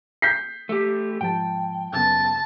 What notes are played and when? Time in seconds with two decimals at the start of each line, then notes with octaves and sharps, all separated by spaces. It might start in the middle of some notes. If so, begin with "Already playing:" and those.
0.22 G6 B6 C7
0.69 A3 G4
1.21 G#2 F3 G5 A5
1.93 F#2 C#3 B3 A5